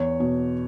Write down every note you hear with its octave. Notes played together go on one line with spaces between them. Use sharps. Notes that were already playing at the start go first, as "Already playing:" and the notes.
Already playing: E2 C#5
B2